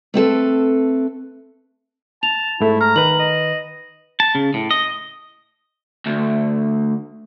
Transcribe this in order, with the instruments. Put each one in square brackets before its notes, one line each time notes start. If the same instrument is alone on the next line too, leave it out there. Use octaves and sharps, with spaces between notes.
[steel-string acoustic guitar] A3 C4 A4 B4
[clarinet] A5 [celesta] F7
[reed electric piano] G#2 A3 [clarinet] E4
[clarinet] A#5 [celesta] F6
[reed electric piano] D#3 B4 [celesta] F#7
[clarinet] D#5
[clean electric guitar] A5
C#3
A2
D#5
[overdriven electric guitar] D2